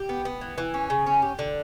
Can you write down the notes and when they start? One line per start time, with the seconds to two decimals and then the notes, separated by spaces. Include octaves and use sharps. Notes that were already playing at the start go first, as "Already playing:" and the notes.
Already playing: G4
0.09 B3
0.25 B3
0.41 E3
0.58 E3
0.74 C#4
0.90 C#3
1.06 C#4
1.22 G4
1.39 D3